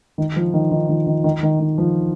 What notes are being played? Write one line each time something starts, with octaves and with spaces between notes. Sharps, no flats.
D#3
F3
D#3
D#3
D#3
D#3
D#3
D#3
D#3
F3